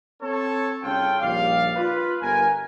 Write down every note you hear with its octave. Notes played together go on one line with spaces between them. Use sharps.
C4 A4 C#5
C2 C#3 C#4 F4 A4 G5
A#1 D#2 G3 D5 F5
F4 B4
G1 A#4 G#5